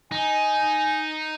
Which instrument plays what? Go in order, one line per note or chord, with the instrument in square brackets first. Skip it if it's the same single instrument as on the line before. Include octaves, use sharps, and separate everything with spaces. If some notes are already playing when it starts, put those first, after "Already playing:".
[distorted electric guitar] D#4 [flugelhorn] G#5